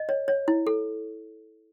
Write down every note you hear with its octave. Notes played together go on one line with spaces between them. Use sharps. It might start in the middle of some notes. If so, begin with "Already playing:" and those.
Already playing: D#5
C#5
C#5
E4
A4